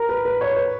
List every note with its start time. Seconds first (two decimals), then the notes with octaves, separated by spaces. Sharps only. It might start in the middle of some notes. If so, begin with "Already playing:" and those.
Already playing: A#4
0.09 B4
0.25 B4
0.41 C#5
0.57 B4